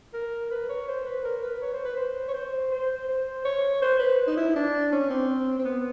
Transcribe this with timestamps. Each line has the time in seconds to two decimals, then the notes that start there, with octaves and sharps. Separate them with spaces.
0.14 A#4
0.51 B4
0.69 C#5
0.88 C5
1.06 B4
1.24 A#4
1.42 B4
1.61 C#5
1.73 C5
1.85 B4
1.97 C5
2.28 C#5
2.34 C5
2.71 C5
3.08 C5
3.45 C#5
3.82 C5
3.99 B4
4.27 D#4
4.37 E4
4.55 D4
4.92 C#4
5.10 C4
5.59 C4
5.64 B3